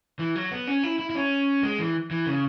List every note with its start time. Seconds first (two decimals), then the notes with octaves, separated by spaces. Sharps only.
0.19 E3
0.36 F#3
0.51 B3
0.67 C#4
0.84 E4
0.99 E4
1.10 E4
1.15 C#4
1.63 G#3
1.79 E3
2.11 E3
2.26 C#3